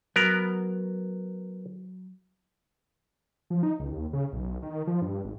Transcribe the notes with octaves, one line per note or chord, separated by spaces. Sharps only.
F#3 B3 A#4
F3
D#4
C#2
D#2
C#3
B1
D#3
F3
G2
G#1